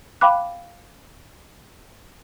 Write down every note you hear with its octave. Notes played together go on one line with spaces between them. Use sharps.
F5 G5 B5 D6 F#6